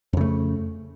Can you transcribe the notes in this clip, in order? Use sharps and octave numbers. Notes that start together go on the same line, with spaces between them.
F2 C#3 A3